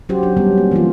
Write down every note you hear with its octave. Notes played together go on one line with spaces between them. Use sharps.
F#3 C#4 F#4 G4 C5
D4
G3 B3 C#4
A#3
E3 A#3 D4 F4